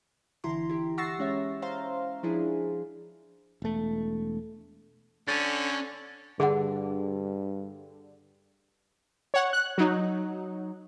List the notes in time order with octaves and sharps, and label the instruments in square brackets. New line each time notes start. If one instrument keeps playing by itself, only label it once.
[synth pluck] G1 D3 E3 E4 A#5 C6
E4 G4
F#5 C#6 E6 A6 A#6 C7
G#3 C#4 C#5 E5
C5 F5 A#5 C6
F3 D4 E4 G#4
[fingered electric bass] E1 A3
[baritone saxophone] D3 [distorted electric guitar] C#4 [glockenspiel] A6
[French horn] G2 [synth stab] D3 [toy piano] G#4 F#5
[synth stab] C#5 F#5
F#6
F#3 D#4